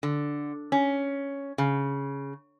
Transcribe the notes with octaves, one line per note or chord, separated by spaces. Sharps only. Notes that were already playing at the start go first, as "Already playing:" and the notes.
D3
C#4
C#3